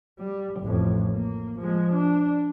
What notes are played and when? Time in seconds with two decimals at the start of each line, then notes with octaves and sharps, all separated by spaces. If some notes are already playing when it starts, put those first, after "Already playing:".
0.19 G3
0.61 A1 F2
1.13 A#3
1.59 F3 G#3
1.94 D4